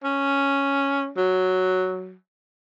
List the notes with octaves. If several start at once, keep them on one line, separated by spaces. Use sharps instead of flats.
C#4
F#3